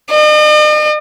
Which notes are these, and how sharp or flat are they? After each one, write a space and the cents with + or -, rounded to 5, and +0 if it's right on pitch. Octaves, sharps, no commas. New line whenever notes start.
D#5 -45